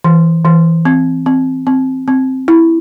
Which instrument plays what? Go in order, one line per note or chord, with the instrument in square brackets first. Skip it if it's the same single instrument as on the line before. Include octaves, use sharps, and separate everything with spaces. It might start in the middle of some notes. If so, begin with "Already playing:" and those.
[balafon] E3
E3
C4
C4
C4
C4
E4